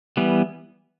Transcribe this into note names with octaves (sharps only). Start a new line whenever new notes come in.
E3 G3 B3